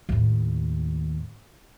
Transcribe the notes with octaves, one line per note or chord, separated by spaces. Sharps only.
D#2 A2